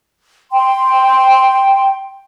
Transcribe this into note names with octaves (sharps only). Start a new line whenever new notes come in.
G5 C6